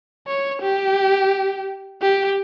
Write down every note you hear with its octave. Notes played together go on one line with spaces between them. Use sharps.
C#5
G4
G4